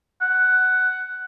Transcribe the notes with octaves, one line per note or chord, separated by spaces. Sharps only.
F#5